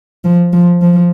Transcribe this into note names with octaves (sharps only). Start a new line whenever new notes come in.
F3
F3
F3